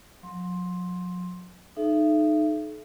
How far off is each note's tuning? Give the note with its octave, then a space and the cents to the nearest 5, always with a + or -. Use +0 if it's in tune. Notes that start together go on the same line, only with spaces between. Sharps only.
F#3 -45 C6 +10
D#4 -20 A4 -40 E5 +35